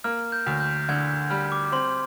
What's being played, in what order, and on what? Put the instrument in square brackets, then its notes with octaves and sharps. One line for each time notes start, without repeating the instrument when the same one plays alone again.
[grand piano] A#3 [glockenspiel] F6
[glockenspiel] G6
[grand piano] D2
[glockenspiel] G6
[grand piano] D3 [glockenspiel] G#6
[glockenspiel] G6
[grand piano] G3 [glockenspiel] F6
[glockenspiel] D6
D6
[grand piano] C4 [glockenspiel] C6